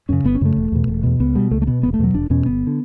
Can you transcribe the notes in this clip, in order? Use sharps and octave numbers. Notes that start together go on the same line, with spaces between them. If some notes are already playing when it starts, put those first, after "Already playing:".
F#2 C#3 C#4
G1 B3
C#4
F#2 C#3 A3
E1
E2 B2
E1
E2 B2
C#2 B3
B2 G3
C#2 A3
A3
B2 B3
E1 B3
A3
E2 B2 F#3
E1 D4
E2 B2 C#4
G1 B3
D3